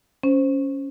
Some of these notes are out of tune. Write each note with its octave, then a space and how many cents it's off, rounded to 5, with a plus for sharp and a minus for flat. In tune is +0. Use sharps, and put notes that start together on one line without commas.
C#4 +0 C5 +0